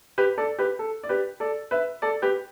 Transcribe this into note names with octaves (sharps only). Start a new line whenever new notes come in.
G4 B4
A4 D5
G4 B4
A4
D5
G4 B4
A4 D5
B4 E5
A4 D5
G4 B4